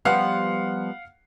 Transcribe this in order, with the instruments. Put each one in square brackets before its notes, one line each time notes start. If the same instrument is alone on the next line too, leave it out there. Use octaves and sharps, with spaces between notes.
[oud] F3 G3 B3 [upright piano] F5 F#5 F6